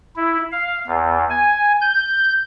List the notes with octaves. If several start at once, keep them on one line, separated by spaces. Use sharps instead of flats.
E4
F5
E2
G#5
G6